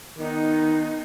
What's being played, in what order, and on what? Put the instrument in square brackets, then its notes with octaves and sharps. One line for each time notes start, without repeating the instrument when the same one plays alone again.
[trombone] D#3 [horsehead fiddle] B3 D#4